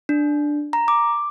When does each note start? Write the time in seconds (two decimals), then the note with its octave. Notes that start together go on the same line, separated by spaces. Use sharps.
0.09 D4
0.73 A#5
0.88 D6